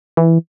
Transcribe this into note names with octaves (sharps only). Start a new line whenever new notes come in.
E3